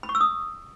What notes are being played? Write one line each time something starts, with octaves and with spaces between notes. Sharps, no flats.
B5
C#6
E6
D#6